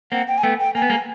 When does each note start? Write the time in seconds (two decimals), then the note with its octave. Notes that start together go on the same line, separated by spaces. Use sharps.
0.12 A#3 C4 F#5
0.28 G5
0.38 G#5
0.43 A3 B3 G5
0.60 G5
0.75 A#3 G#5
0.82 B3
0.90 G#3 A#3